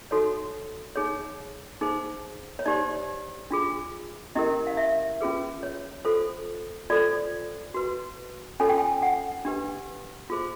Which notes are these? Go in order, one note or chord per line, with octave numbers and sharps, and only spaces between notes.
D#4 F#4 A4 C#5
D#4 G#4 C#5
D#4 G#4 C5
C#5
D#4 G4 C5 D5
D4 F4 G#4
C#4 E4 G4 A#4 D#5
F5
E5
C#4 F4 G#4 B4
C#5
F4 A4 C5
F4 A4 C5 D5
F#4 B4
C#4 F4 A4 C#5 G#5
G5
G#5
F#5
D4 G4 B4
F4 G#4 C5